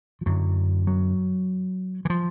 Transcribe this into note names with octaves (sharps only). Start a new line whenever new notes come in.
F3
F#2 D3 F#3
F#3
E3
F3